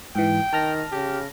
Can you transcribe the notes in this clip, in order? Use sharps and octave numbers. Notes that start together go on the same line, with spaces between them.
G#2 E3 G5
D#3 A5 F6 A#6
C#3 G4